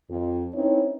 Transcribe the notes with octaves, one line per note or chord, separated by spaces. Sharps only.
F2
C4 C#4 D#4 E4 B4 C#5